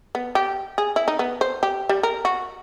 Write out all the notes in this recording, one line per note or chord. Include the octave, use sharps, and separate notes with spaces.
B3
G4
G#4
E4
D#4
B3
C5
G4
G3
A#4
F#4